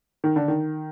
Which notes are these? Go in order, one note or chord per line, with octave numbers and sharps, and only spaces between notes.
D#3
D3
D#3